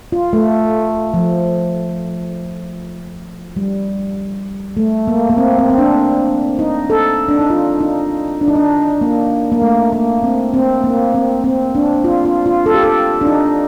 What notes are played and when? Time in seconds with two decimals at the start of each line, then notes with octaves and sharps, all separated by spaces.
0.12 F4
0.33 A3
1.14 F3
3.56 G3
4.77 A3
5.08 A#3
5.30 A#3
5.37 C4
5.59 C4
5.70 C4
5.78 D4
6.59 D#4
6.90 A4
7.29 D4
7.39 D#4
7.50 F4
7.81 D#4
8.41 D4
8.48 D#4
8.55 D4
9.01 A#3
9.52 A#3
9.62 A3
9.92 A#3
10.23 C4
10.54 C4
10.84 A#3
11.15 C4
11.44 C4
11.75 D4
12.04 F4
12.25 F4
12.46 F4
12.66 A4
12.74 G4
12.83 A4
13.21 D4
13.27 D#4